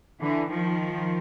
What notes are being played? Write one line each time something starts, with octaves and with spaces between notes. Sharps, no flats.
D3 E3
D#3 F3